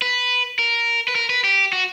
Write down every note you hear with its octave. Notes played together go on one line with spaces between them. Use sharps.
B4
A#4
B4
A#4
B4
G4
F#4